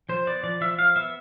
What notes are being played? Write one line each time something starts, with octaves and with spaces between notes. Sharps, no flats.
F3 C5
B3 D5
F3 D5
F3 E5
F3 F5
B3 E5